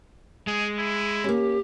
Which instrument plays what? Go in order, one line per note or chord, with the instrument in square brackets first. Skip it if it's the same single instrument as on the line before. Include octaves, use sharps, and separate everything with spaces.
[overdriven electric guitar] G#3 [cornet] G#4
[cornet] E4
[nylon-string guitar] A#3 C#4 [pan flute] G4